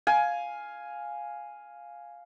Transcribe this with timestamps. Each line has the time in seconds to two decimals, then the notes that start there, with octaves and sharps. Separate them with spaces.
0.07 F5 G#5